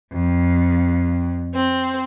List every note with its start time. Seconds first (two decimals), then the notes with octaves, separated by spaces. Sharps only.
0.13 F2
1.54 C4